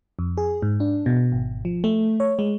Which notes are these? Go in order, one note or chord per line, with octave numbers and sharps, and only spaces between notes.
F2
G#4
G#2
D4
B2
G#1
F3
A3
C#5
G#3